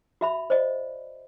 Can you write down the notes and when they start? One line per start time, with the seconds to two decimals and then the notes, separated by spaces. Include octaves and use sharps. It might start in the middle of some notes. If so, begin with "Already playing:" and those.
0.21 F#4 E5 B5
0.50 C5 D5 D#5